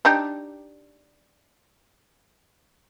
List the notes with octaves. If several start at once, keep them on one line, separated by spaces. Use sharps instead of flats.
D4 D#4 G4